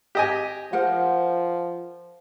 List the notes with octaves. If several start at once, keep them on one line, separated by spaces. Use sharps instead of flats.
G4 D#5 G#5
F3 A#4 C5 F#5